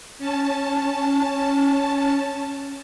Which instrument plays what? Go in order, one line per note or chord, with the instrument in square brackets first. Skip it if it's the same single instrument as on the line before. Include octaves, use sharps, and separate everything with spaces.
[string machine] C#4 A5